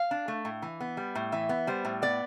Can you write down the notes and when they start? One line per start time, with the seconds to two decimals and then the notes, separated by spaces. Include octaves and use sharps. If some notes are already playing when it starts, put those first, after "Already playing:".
Already playing: F5
0.11 D4
0.28 A3
0.45 A2
0.62 E3
0.80 B3
0.97 G3
1.15 A2
1.32 E3 E5
1.49 B3
1.67 G3 C5
1.85 A2
2.02 B3 D5